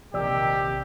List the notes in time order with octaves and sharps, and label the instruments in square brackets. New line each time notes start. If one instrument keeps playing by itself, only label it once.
[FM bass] A#1 [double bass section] C3 D#3 [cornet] G4 [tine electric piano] D5 E6